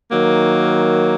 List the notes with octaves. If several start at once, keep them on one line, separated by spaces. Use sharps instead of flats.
D#3 F#3 A#3